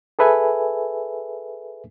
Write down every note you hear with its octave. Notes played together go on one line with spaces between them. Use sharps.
G#4 A4 B4 E5 G#5